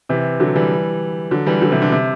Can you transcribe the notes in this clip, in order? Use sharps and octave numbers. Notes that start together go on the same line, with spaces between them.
C3 E3
D3 F#3
E3 G3
D3 F#3
E3 G3
D3 F#3
C3 E3
D3
C3